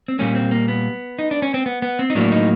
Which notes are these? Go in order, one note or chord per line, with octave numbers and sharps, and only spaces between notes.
C4
A#2 G3 A#3 C#4
C4
A#3
B3
D#4
D4
C#4
C4
B3
B3
C4
D#4
A2 F#3 A#3 D4
D#4